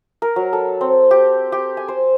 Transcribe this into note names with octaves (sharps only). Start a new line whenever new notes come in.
A#4
F#3
A4
C4
G4
G4
G#5
C5